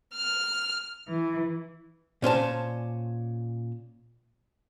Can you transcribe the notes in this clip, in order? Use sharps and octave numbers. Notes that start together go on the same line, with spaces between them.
F6
E3
A#2 C#4 C5 A5